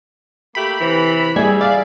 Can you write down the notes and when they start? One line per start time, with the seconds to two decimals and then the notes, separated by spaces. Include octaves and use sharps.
0.55 A3 A#3 G4 B5
0.79 C3 E3
1.36 G3 G#4 E5 G#5
1.61 D5 F5